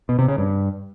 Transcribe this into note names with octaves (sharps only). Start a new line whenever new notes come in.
B2
C3
C#3
G2